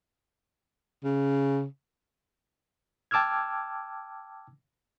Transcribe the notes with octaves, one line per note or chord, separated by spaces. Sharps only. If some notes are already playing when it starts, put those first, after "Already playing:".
C#3
G5 A5 D6 E6 F6 G#6